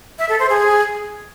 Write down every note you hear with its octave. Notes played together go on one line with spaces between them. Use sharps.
E5
A4
C5
G#4